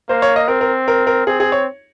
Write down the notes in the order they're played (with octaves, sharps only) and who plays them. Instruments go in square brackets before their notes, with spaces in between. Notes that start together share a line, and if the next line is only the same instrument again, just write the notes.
[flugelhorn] A#3 [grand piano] C5
[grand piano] C#5
D#5
[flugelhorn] C4 [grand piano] A#4
[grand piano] A#4
A#4
A#4
[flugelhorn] C4 [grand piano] G#4
[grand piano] G#4
C#5